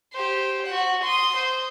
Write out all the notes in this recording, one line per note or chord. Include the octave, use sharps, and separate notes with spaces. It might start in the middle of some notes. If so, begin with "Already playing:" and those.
G4 C5
F#4 F#5
C6 D#6
C5